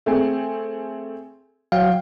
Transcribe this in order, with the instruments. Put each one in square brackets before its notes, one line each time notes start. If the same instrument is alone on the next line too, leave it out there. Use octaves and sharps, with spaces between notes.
[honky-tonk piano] A3 C4 G#4
[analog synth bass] F#3 [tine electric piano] F5 [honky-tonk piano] G5